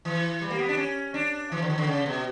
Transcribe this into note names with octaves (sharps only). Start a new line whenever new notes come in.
E3
G3
A#3
B3
D4
C#4
D4
E3
D3
E3
D3
C#3
B2